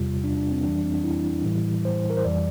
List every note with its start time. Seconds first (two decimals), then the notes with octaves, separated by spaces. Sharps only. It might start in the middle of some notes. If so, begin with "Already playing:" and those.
Already playing: E2 C3 G3 F4
0.24 D4
0.37 D4
0.51 C4
0.64 F2 E3 G3 D4
0.84 C4
0.94 D4
1.04 E4
1.44 A2 E3 G3
1.85 C5
2.10 A#4
2.17 C5
2.25 F2 E3 G3 D5